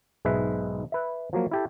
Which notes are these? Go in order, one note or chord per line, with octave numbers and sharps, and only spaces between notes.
B1 G#2 G#3 B4 E5
B4 E5
F3 F#3 A#3
E4 G4 A4